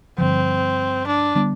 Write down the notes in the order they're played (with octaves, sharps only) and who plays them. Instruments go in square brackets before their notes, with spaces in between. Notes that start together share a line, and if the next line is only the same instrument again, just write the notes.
[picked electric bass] G2 D3 F3 [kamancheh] C4
[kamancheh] D4
[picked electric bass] D3 G3 B3